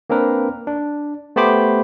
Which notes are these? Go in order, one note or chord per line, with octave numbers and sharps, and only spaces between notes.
A#3 C4 D4 A#4 B4
D4
A3 B3 G4 C5 B5 D6